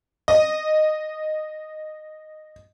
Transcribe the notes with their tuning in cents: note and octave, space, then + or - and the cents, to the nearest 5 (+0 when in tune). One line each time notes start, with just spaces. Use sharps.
D#5 -10